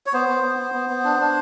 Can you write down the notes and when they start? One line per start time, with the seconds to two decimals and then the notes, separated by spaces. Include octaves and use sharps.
0.06 C#5
0.13 B3 C5
0.29 B3
0.43 B3
0.59 B3
0.74 B3
0.90 B3
1.04 D4
1.20 D4